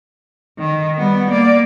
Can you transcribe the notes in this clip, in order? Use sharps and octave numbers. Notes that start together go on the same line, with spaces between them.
D#3
G3 B3
A#3 D5